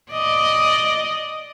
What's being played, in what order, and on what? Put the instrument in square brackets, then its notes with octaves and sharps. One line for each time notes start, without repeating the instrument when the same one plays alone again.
[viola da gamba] D5 D#5